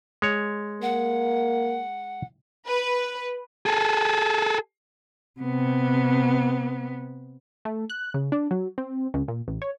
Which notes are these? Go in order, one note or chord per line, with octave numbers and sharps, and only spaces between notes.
G#3 C#5
A#3 F#5
B4
G#4 A4
C3 B3
A3
F#6
C#3
D4
F#3
C4
C#2
A#2
A1
C#5